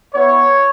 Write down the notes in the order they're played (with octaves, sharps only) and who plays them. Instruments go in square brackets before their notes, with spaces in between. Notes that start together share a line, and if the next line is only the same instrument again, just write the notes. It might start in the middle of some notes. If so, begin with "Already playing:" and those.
[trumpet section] B3 E4 C#5